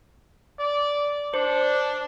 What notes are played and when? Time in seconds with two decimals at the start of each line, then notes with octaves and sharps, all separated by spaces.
0.59 D5
1.34 D4 C5